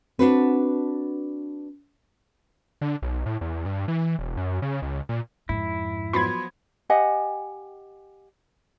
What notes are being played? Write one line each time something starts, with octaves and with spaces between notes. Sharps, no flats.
C4 D4 F#4 B4
D3
B1
A2
E2
G2
E3
E1
F#2
C#3
C#2
A#2
F2 G#2 E4
F3 F#3 B3 B5 C6 G#6
G4 D#5 F#5 G#5